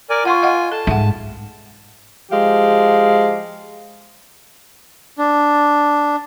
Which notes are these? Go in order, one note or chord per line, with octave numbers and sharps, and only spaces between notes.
A#4 D5 G#5
F4 F#5 G#5 C6 C#6
D#5 F5 F#5
A4 A5
G#2 E5 F#5
F3 G#3 G4 F5
D4